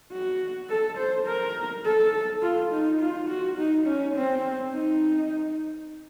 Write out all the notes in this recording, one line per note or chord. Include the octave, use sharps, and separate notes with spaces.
F#4
A4
C5
A#4
A4
F4
D#4
F4
F#4
D#4
C#4
C4
D#4